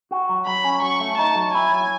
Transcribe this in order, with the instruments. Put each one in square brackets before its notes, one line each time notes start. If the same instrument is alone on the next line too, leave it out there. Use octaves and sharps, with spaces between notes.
[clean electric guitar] F#4
F#3
[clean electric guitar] F#3 [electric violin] B5
[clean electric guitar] C#4
[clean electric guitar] F#3 [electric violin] C#6
[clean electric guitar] A3
[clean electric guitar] D#4 [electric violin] A5
[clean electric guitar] F#3
[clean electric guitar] E4 [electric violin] G#5
[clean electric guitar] F#3